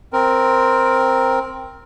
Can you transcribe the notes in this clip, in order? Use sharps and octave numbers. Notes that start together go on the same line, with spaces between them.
C4 A#4